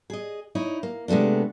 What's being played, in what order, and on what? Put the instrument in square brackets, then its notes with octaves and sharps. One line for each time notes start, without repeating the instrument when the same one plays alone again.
[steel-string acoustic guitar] G#4 D#5
D#4 E4 C#5
A#3
C3 G#3 A3 B3 D4